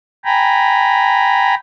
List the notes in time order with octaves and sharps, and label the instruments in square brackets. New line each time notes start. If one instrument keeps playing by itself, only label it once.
[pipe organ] G5 G#5 A#5 B5